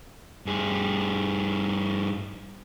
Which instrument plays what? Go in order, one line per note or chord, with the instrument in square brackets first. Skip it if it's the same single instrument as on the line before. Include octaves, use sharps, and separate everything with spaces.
[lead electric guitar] G2 G#4